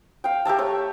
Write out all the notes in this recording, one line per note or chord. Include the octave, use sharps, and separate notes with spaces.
F5 G5
G4 A#4 E5 A5
A3 C#5